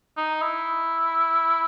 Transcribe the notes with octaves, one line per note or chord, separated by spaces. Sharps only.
D#4
E4